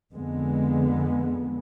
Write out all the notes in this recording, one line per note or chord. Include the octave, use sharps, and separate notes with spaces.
F2 D3 G#3 B3